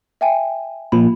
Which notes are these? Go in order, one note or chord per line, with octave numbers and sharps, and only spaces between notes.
E5 G5 G#5
A#2 F3 B5